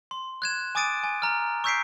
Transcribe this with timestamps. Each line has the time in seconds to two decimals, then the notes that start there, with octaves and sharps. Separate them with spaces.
0.11 C6
0.42 F#6 G#6 E7
0.75 G#5 D6 D#6 A6 D7 D#7
1.04 G#5
1.22 A#5 F6
1.64 C#6 E6 G6 B6 C7 D7